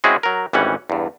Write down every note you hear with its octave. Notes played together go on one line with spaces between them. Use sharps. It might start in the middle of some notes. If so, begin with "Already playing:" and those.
G#3 C4 C#4 E4 F#4 G#4
F#3 A#4
G#1 E3 G3 C#4 F#5
E2 G2